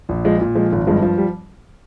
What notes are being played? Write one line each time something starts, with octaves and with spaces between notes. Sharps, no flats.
A#1
F3 G#3
A#2
F3 G#3
G#1
G2 F3 G#3
F3
G3